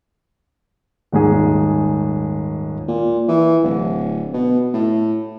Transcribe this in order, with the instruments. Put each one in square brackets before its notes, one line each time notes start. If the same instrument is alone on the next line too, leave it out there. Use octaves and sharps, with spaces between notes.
[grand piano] D#1 G#2 G#4
[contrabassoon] A#2
E3
D1
B2
A2